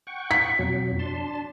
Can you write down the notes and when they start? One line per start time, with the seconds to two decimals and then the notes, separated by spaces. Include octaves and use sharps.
0.07 F#5 G5 C#6
0.31 B6
0.59 F2 B2 F#3
0.99 D4 A5 C6